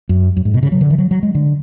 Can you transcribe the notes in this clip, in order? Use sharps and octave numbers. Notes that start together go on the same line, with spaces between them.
F#2
F#2
G#2
B2
C#3
F#3
D3
E3
F#3
F#3
G#3
D3